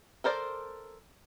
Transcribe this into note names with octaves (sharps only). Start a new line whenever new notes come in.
A4 A#4 C5 D5